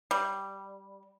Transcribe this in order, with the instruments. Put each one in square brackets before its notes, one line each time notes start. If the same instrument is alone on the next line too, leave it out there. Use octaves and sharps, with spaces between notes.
[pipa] G3